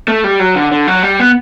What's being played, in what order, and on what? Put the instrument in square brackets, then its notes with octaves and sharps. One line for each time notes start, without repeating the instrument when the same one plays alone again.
[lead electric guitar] A3
G3
F#3
D3
D3
F#3
G3
B3